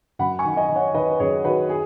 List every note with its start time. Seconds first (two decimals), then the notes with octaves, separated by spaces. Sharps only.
0.19 F#2 F#5 B5
0.39 G#5 C#6
0.45 D#3
0.57 D#5 G#5
0.69 D#3
0.75 C#5 F#5
0.94 D#3 B4 D#5
1.11 B4
1.20 F#2 G#4 C#5
1.44 D#3 F#4 B4
1.70 G#4